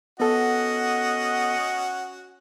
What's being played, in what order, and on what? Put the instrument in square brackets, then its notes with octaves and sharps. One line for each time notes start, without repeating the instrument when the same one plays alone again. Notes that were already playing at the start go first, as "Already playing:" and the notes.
[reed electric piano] B3 A4 [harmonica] C#4 F#4 [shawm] D#5 [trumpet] F#5